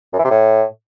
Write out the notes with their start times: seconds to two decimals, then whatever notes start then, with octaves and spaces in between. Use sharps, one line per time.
0.13 F#2
0.19 E3
0.25 C3
0.30 A2